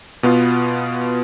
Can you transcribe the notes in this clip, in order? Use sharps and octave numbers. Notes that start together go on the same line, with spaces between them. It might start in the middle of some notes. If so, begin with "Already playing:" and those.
B2 B3 F4